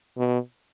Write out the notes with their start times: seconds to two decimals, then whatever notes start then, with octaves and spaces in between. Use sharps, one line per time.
0.18 B2